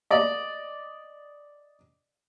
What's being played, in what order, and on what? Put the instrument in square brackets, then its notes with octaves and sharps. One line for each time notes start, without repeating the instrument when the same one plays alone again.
[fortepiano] D5 D#5